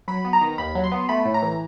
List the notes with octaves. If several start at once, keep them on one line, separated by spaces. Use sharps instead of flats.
F#3 B5
B3
A#5
D#3
D#2 B5
F#3
C6
B3
A3 B5
A2
A#5
E3